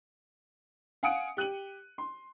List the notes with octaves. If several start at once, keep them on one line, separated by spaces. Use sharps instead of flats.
F5 F#5 G#5 D#6 C#7 D7
G4 F#6 D#7 F#7
C6